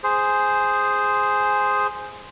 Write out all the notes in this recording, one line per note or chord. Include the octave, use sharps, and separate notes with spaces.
G#4 C5